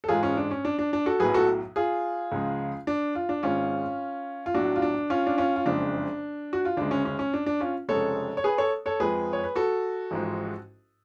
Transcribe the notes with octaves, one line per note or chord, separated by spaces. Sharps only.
A4
A1 G#2 G#3 F4 G#4
C#4 F4
D4
C#4
D4
D4
D4
F#4 A4
B1 A2 F#3 G#4 B4
F#4 A4
F4 G#4
C#2 C#3 F3 G#3
D4
F4
D4
G#1 G#2 G#3 C#4 F4
F4
B1 A2 F#3 D4 F#4
F4
D4
C#4 F4
D4
C#4 F4
F4
F#1 F2 C#3 G#3 D4
F#4
F4
D2 C#3 G#3 D4
C#4
C#4
C#4
D4
D4
C#4 F4
F1 F2 C#3 G#3 A4 C#5
C#5
G#4 B4
A4 C#5
A4 C#5
F2 F3 G#3 G#4 B4
C#5
B4
F#4 A4
A1 G#2 F3 G#3